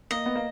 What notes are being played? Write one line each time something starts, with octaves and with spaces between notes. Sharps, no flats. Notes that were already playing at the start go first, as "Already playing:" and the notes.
A#3 D#5
B3
A#3